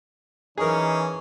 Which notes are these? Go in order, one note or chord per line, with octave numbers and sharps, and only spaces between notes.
E3 C#4 D#4 G#4 A#4